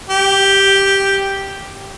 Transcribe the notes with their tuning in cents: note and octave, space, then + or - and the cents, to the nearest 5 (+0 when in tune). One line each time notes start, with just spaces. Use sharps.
G4 +0